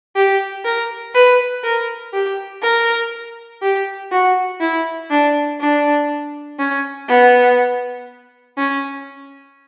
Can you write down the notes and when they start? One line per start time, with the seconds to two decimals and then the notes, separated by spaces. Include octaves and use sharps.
0.16 G4
0.65 A#4
1.15 B4
1.64 A#4
2.14 G4
2.63 A#4
3.62 G4
4.12 F#4
4.61 E4
5.11 D4
5.61 D4
6.59 C#4
7.09 B3
8.57 C#4